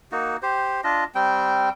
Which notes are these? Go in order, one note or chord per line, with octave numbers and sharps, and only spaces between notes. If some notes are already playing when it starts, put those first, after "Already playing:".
A#3 D#4 F#4
G4 C5
D4 F4 D#5
G3 C4 G5